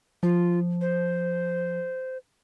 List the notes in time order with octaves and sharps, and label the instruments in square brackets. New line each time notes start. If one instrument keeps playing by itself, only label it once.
[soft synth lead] F3 [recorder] F4
[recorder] C5